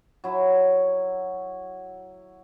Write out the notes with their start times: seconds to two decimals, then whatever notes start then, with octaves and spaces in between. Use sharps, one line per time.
0.24 F#3 E4 E5